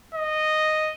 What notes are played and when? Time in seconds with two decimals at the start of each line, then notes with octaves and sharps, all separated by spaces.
0.15 D#5